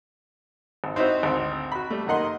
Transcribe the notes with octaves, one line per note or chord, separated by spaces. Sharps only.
G#1
C4 D#4 E4 F#4 C5
G#1 D2 C4
F#4 B5
G3 A3
F#2 D#3 A#3 D#5 F#5 C6